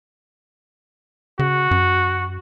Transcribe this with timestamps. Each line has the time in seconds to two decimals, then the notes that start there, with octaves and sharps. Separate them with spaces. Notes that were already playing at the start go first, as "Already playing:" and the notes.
1.39 C#3 F#4
1.71 F#2